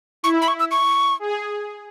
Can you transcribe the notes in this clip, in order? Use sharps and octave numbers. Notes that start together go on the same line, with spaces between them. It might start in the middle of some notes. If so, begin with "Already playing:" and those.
E4 C#6
B5
C#6
E6
C#6
G#4